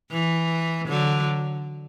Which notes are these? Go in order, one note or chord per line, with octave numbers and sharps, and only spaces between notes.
E3
D3 F#3